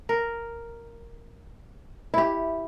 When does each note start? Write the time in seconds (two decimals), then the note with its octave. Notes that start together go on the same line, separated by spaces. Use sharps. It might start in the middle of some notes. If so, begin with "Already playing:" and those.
0.09 A#4
2.14 E4 G4